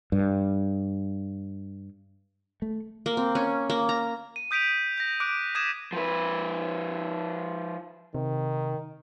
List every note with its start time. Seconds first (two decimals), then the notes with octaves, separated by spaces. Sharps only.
0.12 G2
2.62 A3
3.06 A#3
3.17 C4
3.35 C#4
3.70 A#3
3.89 A#5
4.36 D#7
4.51 D#6 G6 B6 D7 D#7 F7
4.98 G6 A#6
5.20 D6 F#6 D7
5.55 D#6 G#6 B6 D#7 E7
5.93 F3 B4
8.15 C3 D#3